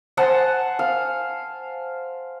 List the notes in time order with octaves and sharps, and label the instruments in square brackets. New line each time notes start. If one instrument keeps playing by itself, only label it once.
[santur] C5 F#5 G#5 A5
F5